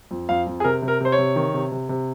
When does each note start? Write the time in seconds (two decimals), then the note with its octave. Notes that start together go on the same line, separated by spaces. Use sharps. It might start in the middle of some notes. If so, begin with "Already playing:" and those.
0.11 F2
0.29 F2 F5
0.47 F2
0.60 G#4
0.64 C3 A#4
0.82 C3
0.88 A#4
1.01 C3 C5
1.12 C#5
1.18 C3
1.36 D#3
1.54 C3
1.72 C3
1.89 C3